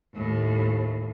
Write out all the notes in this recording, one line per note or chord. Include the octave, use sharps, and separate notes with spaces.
D#2 A2